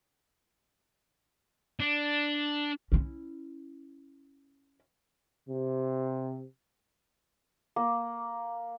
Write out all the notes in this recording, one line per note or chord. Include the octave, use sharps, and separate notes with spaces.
D4
C#4 E4
C3
A#3